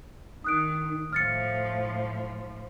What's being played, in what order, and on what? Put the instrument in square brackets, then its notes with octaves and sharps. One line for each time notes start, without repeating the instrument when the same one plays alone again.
[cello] D#3 [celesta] D#6 F#6 D7
[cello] A2 F3 [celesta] F6 A6 C#7